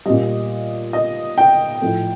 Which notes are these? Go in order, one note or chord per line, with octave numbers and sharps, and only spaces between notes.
A#2 G3 D#5
D#5
G5
A2 F3